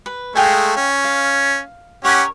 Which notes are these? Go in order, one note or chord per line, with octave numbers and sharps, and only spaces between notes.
B4
G#3 A3 F5 G5 G#5
C#4
F5
C#4 G4 A#4 C#5 F#5